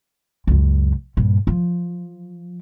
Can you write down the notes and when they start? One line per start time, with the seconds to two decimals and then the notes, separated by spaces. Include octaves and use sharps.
0.47 C#2 F#2
1.17 G2 A#2
1.47 F3